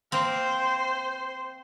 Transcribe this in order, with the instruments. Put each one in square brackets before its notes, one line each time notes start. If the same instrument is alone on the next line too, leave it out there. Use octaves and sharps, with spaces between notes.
[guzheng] A#3 C4 [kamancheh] C5